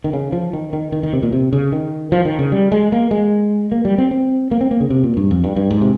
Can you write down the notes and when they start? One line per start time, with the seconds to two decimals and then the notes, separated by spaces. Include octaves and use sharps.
0.04 D#3
0.13 C#3
0.32 F3
0.53 D#3
0.73 D#3
0.92 D#3
1.03 D#3
1.13 C3
1.23 A#2
1.32 C3
1.53 C#3
1.72 D#3
2.12 F3
2.25 D#3
2.39 C#3
2.52 G3
2.72 G#3
2.92 A#3
3.11 G#3
3.72 A#3
3.85 G3
3.98 C4
4.11 C4
4.51 A#3
4.61 C4
4.71 A#3
4.80 C#3
4.90 C3
5.04 A#2
5.17 G2
5.31 F2
5.44 G2
5.56 G2
5.71 G#2
5.81 C3